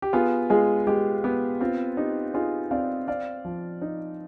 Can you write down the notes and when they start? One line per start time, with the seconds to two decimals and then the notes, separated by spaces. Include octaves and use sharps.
0.02 G4
0.13 B3 F4 G#4
0.50 G#3 F4 G#4
0.87 G#3 G4
1.24 B3 G4
1.61 C4 F4
1.97 D#4 G4
2.34 D#4 F4 G#4
2.71 C4 D5 F5
3.08 C4 D5 F5
3.45 F3
3.82 D#4